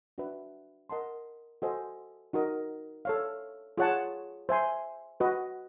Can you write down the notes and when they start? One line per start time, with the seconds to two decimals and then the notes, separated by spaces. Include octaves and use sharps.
0.18 D4 F#4 B4 E5
0.90 A#4 D#5 F#5 A5 C6
1.62 F#4 A4 C5 D#5 G#5
2.33 D#4 F#4 A#4 D#5
3.05 A4 C#5 F5
3.78 F4 G#4 C#5 F#5 A5
4.49 C5 E5 G#5 C6
5.20 F#4 B4 D#5